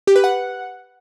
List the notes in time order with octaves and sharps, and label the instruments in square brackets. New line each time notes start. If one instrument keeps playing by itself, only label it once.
[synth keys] G4
B4
F#5